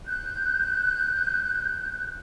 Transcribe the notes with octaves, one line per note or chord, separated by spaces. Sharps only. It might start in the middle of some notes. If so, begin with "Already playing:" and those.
F#6 G6